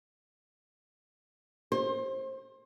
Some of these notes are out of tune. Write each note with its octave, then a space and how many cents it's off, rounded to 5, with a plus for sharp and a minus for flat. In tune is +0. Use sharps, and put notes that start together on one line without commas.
C5 +25